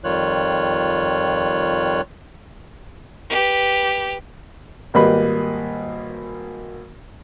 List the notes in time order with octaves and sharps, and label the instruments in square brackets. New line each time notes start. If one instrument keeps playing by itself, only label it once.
[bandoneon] F2 D#3 G3 F4 C#5 F#6
[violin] G4 B4
[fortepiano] G#1 G3 A#3 B4 D#5 B5